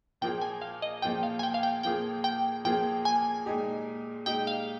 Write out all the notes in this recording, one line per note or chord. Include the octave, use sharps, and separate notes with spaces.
A#2 F3 A#3 F4 G#4 G5
G#5
F5
D#5
A#2 F3 A#3 F4 G#4 G5
F5
G#5
G5
F5
G5
A#2 F3 A#3 F4 G#4 G5
G5
A#2 F3 A#3 F4 G#4 G5
G#5
A#2 G#3 D#4 G4
A#2 G#3 D#4 G4 G5
F5